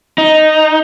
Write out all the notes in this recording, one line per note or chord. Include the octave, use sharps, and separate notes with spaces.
D#4